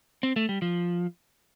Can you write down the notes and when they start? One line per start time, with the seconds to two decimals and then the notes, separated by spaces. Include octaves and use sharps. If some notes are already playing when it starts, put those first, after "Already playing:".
0.23 C4
0.36 A3
0.49 G3
0.62 F3